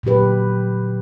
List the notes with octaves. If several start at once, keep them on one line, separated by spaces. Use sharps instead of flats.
A#2 D3 F#3 G4 B4